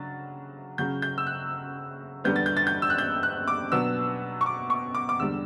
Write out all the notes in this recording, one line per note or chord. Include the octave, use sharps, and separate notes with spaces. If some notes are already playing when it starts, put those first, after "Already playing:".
Already playing: C#3 F#3 D4 A6
C#3 F#3 C#4 G6
G6
E6
F#6
E2 D3 G3 B3 G6
A6
G6
A6
G6
E6
F#6
G6
F#6
D6
B2 F#3 B3 D4 E6
C#6
D6
C#6
D6
D6
E2 D3 G3 E6